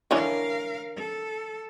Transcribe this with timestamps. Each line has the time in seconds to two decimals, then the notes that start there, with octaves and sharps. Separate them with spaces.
0.11 D3 E3 C#4 A#4 F5
0.96 A4